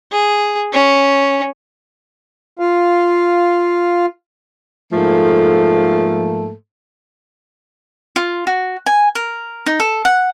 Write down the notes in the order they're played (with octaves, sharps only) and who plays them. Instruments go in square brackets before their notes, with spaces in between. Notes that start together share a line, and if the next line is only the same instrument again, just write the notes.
[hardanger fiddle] G#4
C#4
[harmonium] F4 F5
[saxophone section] G#2 F3 A3 A#3 A4
[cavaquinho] F4
F#4
G#5
A#4
D#4
A4
F#5